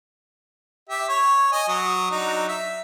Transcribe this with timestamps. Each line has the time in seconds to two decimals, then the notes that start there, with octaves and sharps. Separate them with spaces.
0.89 G4 E5
1.09 C#5
1.52 D#5 G#5
1.68 F#3 D#6
2.11 F#3 D4 D#4
2.48 E5